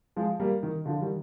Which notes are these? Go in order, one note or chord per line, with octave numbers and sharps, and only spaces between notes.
F3 G#3
G3 A#3
D#3
D3 F3
D#3 G3